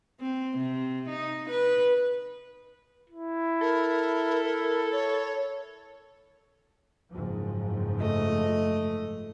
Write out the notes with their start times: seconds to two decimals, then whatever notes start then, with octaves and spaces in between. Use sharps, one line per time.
0.20 C4
0.58 C3
1.09 D#4
1.50 B4
3.09 E4
3.61 A4 A#4
4.92 C#5
7.12 F#1 G#2 F3
7.99 A3 D#5